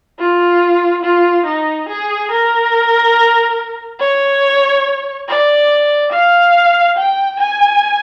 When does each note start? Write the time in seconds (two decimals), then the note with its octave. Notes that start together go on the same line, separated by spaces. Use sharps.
0.19 F4
1.03 F4
1.45 D#4
1.88 G#4
2.31 A#4
4.00 C#5
5.27 D5
6.12 F5
6.97 G5
7.39 G#5